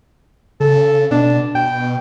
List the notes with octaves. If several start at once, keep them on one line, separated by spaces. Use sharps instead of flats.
C#3 A4
B2 D4
B2 G5